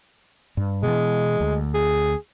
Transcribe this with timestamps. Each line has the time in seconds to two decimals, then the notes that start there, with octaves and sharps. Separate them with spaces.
0.57 G2
0.83 B2 E3 G#3
1.40 D2
1.74 G#4